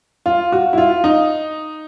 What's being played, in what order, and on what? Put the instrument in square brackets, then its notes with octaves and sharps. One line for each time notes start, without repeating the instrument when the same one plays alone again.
[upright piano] F4
F#4
E4
F4
D#4